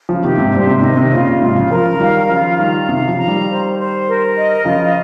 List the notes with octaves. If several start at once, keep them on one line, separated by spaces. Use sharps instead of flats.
C#3 F3
C3 D#3 G4
G#2 C3
G2 A#2 C5
G#2 C3
C3 D#3 D#5
C3 D#3
A#2 C#3 F4
A#2 C#3
G#2 C3 F4
C#3 F3
C#3 F3 A#4
F3
D#3 G3 F5
C#3 F3 F4
D#3 G3 A#5
C3 D#3 F5
C#3 F3
A#5
D#3 G3
C5
C5
A#4
D#5
C#3 F3 F4